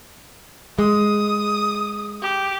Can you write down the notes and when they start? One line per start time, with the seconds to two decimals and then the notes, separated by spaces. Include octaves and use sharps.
0.79 G#3 D#6
2.22 G4